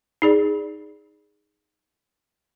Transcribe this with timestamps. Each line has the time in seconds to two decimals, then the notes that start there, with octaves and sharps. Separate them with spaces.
0.22 D#4 G#4 D5